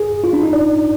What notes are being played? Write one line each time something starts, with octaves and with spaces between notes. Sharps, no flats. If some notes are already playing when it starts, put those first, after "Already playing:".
Already playing: G#4
F4
D4
D#4
D5